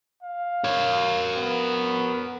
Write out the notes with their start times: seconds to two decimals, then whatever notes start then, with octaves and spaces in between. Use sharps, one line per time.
0.23 F5
0.64 A#4 C#5
1.36 B3